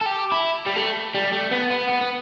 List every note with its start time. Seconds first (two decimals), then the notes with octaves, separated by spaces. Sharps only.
0.01 A4
0.06 G4
0.32 E4
0.67 G3
0.76 A3
1.15 G3
1.33 A3
1.51 B3
1.71 B3
1.89 B3
2.01 B3